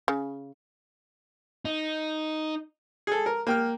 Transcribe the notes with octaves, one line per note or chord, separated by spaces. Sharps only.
C#3
D#4
G#4 A4
A#4
A#3 G5 F6